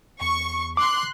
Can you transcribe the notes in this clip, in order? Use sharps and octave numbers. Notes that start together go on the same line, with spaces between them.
E2 C#6
C6 D6 F#6